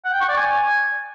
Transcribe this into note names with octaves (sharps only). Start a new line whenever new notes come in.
F#5
G5
C#6
D5
G#5